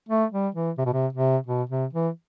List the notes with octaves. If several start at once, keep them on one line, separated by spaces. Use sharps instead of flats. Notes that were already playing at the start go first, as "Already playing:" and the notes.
A3
G3
E3
C3
B2
C3
C3
B2
C3
E3